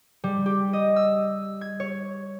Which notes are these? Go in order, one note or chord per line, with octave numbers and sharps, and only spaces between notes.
G3
G4
D#5
E6
G#6
C#5